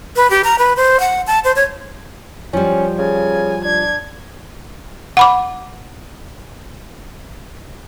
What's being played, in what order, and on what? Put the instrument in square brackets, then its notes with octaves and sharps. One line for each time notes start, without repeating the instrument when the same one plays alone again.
[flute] B4
G4
A#5
B4
C5
F#5
A5
C5
C#5
[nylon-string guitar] F3 G3 [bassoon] C#4
[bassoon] C#3 [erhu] G#5
[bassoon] D4 [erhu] G#6
[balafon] F#5 B5 D6